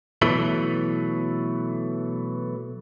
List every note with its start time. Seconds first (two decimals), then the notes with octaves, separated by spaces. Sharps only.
0.22 B2 E3 F#3 A3